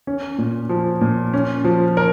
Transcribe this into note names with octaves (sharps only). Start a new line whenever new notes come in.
C#4
A#2
F3
A#2
C#4
F3
A#4